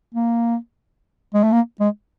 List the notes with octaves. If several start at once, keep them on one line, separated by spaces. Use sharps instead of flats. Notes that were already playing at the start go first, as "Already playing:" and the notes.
A#3
G#3
A3
A#3
G#3